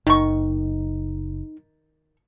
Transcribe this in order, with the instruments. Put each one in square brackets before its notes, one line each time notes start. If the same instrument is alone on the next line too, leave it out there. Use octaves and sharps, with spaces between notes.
[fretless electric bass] F#1 [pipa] D#3 C#6 [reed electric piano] D#4